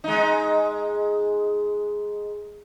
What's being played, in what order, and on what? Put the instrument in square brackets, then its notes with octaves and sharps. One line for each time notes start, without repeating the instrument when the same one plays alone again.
[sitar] G#3 D#4